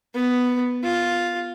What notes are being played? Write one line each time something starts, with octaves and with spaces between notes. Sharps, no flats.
B3
F4